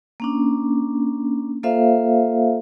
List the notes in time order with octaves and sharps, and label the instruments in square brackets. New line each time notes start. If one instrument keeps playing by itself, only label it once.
[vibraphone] A#3 C#4 D4
A#3 F4 A4 C5 E5 F5